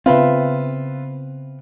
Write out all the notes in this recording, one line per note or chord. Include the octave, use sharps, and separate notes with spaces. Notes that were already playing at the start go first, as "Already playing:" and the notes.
C#3 B3 C4 F4 B4 E5